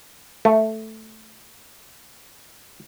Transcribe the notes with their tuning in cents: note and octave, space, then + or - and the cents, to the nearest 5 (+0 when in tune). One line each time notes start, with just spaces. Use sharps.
A3 +0